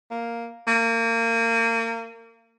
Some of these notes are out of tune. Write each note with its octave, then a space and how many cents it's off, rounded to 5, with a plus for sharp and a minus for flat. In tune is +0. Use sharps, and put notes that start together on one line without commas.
A#3 +0
A#3 -30